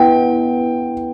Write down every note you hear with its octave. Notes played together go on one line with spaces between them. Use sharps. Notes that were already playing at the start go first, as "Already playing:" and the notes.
Already playing: B3 E4 B4 F#5 G5